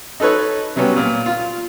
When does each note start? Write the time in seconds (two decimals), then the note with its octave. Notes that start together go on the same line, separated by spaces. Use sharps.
0.20 D#4 A4 B4 C#5
0.76 C3 F#3 G3 B3 C#4
0.97 A#2
1.26 F4